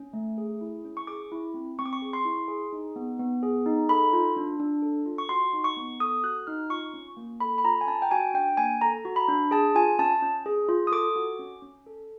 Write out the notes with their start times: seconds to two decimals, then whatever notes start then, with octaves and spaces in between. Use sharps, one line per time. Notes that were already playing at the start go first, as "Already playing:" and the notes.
Already playing: C#4
0.13 A3
0.38 G#4
0.61 E4
0.85 C#4
0.97 C#6
1.07 G#4 D6
1.32 E4
1.54 C4
1.79 C4 C#6
1.86 D6
1.93 C#6
2.02 G#4
2.13 C6
2.25 E4
2.48 G#4
2.72 D#4
2.96 B3
3.19 B3
3.43 G#4
3.66 D#4
3.89 A4 B5
4.13 F4
4.37 D4
4.60 D4
4.82 A4
5.06 F4
5.18 C#6
5.29 F#4 C6
5.53 D#4
5.64 C#6
5.77 B3
6.00 A4 D#6
6.24 F#4 F#6
6.47 D#4 F6
6.70 F4 C#6
6.94 C#4
7.17 A#3
7.40 A4 B5
7.58 B5
7.64 F4 A#5
7.81 G#5
7.87 C#4 A5
8.02 G5
8.11 F#4 G#5
8.34 D4 G5
8.57 A#3 G#5
8.81 A4 A#5
9.05 F#4
9.16 B5
9.28 D4
9.51 G#4 A5
9.75 F4 G#5
9.99 C#4 A5
10.22 C#4
10.46 G#4
10.69 F4
10.87 D#6
10.92 A4 D6
11.16 F#4
11.39 C#4
11.62 C#4
11.86 A4